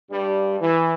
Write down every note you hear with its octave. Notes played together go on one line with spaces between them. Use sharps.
G2 G3
E3